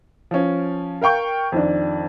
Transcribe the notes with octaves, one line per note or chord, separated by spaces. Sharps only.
F3 C#4
A#4 F5 G5 C#6 G6
F2 D#3 D4